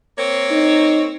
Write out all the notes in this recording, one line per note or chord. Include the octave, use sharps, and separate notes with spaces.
A#3 C4 C#5
D#4